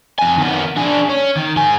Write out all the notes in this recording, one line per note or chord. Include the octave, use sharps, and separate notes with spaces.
F2 G#5
D#3 B3
D4 G#4
C#4
D#3
G#2 G#5